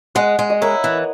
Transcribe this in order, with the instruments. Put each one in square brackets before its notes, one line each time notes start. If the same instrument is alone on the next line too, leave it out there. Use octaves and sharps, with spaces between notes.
[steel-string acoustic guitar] G#3 [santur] D#5 F#5
[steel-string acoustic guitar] G#3
[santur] D#5
[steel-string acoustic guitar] E4 [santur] A#4 C#5
[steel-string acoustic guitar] E3